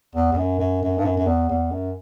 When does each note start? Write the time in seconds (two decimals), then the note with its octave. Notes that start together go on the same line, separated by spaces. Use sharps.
0.15 E2
0.32 E2
0.37 F#2
0.59 F#2
0.83 F#2
0.98 G2
1.04 F#2
1.17 F#2
1.27 E2
1.49 E2
1.71 F#2